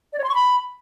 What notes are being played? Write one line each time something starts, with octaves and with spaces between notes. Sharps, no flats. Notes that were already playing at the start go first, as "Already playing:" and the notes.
D5
C#5
C6
C#6
B5